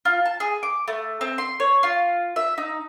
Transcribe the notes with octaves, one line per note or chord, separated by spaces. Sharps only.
F4
A5
G#4
D6
A3
C4
C6
C#5
F4
E5
D#4